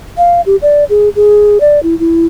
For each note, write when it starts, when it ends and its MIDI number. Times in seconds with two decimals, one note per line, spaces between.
0.17 0.41 77
0.46 0.56 67
0.62 0.84 74
0.89 1.09 68
1.16 1.58 68
1.60 1.82 74
1.83 1.98 64
1.99 2.26 64